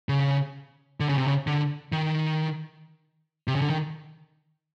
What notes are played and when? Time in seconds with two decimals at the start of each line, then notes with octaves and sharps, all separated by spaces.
0.09 C#3
1.00 D3
1.09 C#3
1.18 C3
1.27 C#3
1.47 D3
1.92 D#3
3.48 C3
3.56 C#3
3.61 D3
3.70 D#3